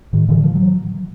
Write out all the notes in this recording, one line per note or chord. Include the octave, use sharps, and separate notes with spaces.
A2 D#3
D3 E3
F3
F#3